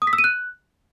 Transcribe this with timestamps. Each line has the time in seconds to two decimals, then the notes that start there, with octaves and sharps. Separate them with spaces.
0.02 D#6
0.07 B6
0.13 E6
0.18 D#7
0.24 F#6